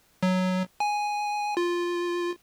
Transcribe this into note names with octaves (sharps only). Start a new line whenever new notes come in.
F#3
G#5
F4